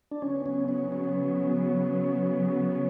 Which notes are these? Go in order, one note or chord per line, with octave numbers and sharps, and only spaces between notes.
D4
C#3 F#3 B3 C#4
C#4
C#4
C#4